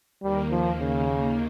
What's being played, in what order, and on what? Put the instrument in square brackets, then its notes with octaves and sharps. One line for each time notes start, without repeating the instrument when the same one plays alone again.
[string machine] D#2 D#3 A#3 [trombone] G3
[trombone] F3
C#3